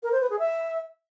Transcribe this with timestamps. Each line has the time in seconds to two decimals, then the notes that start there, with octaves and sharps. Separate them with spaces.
0.03 A#4
0.12 C5
0.21 B4
0.30 G#4
0.39 E5